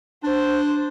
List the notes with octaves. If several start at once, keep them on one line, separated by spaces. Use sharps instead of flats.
D4 C5